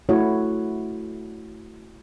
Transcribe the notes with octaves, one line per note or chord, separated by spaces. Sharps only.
A3 E4 F#4 C#5